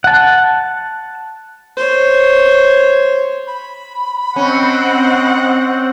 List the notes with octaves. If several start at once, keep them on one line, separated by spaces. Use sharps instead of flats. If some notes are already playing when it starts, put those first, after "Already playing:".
F#5 A5
C5 C#5
B5
C4 C#4 D#5 F#5